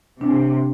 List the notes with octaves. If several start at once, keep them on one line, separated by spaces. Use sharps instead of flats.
C3 D4